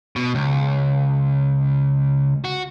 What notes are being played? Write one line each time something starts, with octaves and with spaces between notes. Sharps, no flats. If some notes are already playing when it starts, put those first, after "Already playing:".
B2
C#2
F#4